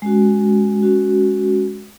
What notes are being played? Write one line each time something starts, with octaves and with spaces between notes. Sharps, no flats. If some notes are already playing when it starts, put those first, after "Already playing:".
G#3 C#4 F#4
G#3 C#4 F#4